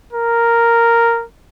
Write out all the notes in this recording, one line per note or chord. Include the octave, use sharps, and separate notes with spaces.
A#4